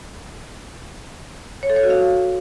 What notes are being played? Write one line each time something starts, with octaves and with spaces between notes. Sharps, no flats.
C#5
A4
C#5
F#4
F5